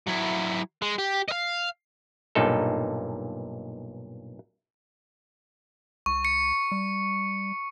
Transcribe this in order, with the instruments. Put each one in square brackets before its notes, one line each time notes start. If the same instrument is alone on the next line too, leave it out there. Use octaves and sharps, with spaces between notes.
[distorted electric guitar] F#3 E4
G#3
G4
D#5 F5
[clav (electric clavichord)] B1 G2 A#2 D#4 A4
[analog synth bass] C2 [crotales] C#6
[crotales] C#7
[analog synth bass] G3